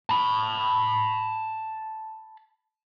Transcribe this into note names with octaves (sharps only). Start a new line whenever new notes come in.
A5 B5